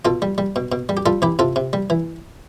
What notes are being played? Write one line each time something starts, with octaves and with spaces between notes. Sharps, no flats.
B2 F4 A4
G3
G3
B2
B2
G3
G4
G3 F4 A4
E3 G4 B4
C3 F4 A4
C3
G3
E3